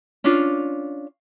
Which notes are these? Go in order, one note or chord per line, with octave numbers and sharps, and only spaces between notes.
C#4 D4 F4